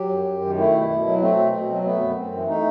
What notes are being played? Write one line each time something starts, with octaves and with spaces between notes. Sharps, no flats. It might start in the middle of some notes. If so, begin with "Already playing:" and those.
Already playing: F#3 G4
F#2
F#2
D#3
A3 E4
B2
B2
F#3
A3 C4
B2
B2
F#3
A3 B3
F#2
F#2 C4
E3
A3 D#4